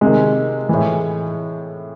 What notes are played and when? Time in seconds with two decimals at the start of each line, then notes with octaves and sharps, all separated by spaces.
0.01 C3 D#3 G#3
0.69 A2 E3